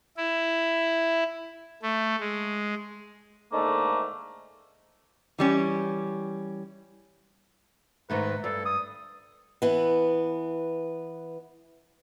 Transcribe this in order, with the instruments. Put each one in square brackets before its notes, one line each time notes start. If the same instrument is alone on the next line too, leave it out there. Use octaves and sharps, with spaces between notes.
[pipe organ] E4
A3
G#3
[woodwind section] G#2 D3 D#3 A3 A#3
[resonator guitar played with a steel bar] E3 G3 C#4
[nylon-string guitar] G#2 D#3 A3 [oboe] B4
[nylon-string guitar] G2 [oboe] A4
[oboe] D#6
[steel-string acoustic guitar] E3 B3